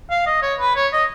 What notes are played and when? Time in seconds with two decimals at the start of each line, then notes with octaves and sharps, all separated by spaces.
0.10 F5
0.26 D#5
0.42 C#5
0.59 B4
0.76 C#5
0.93 D#5